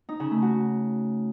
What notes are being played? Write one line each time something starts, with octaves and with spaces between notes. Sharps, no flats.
D#4
C#3
A3
F#4